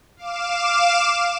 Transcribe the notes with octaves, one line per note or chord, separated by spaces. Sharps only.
F5 D6 E7